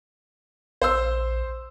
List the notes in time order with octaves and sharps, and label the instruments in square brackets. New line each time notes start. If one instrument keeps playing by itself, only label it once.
[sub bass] A#1 [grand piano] C5 C6 E6